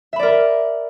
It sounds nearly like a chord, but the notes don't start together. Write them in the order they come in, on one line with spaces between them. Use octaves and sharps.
E5 B5 D5 A#4